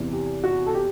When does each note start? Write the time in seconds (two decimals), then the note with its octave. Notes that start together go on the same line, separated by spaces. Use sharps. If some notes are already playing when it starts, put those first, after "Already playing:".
Already playing: E2 C3 E3
0.12 G4
0.44 F#4
0.67 A4
0.74 G4